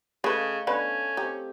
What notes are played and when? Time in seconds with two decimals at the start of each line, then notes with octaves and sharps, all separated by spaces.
0.24 C#3 A3 G#4 B4 D#5 F5
0.67 D3 B3 C#4 B4
1.17 C4 D#4 G4